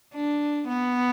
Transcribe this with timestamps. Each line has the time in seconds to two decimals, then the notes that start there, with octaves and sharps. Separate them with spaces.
0.14 D4
0.68 B3